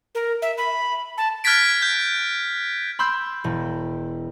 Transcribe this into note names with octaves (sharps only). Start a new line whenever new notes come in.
A#4
E5
B5
A5
F6 F#6 G#6 A6 B6 D7
G6
B5 C6 E6 G6
E1